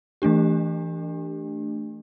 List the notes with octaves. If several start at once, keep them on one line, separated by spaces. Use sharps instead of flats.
E3 A3 D4 G4